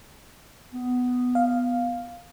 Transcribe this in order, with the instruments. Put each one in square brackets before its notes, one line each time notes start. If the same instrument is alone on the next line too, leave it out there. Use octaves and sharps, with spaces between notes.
[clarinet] B3
[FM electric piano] F5